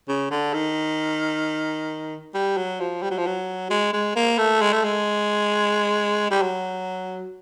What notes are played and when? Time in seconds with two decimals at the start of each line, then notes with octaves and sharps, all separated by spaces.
0.08 C#3
0.30 D3
0.54 D#3
2.34 G3
2.57 F#3
2.80 F3
3.02 G3
3.11 F#3
3.18 F3
3.26 F#3
3.70 G#3
3.93 G#3
4.16 A#3
4.38 A3
4.61 G#3
4.73 A3
4.84 G#3
6.30 G3
6.42 F#3